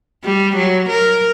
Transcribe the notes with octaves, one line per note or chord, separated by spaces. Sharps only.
G3
F#3
A#4